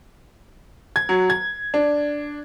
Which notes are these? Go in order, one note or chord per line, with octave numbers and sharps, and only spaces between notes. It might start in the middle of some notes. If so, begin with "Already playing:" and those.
G#6
F#3
G#6
D4